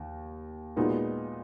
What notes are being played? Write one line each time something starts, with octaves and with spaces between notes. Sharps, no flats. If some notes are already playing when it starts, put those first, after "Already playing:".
Already playing: D#2
A#2 G#3 B3 D#4 F#4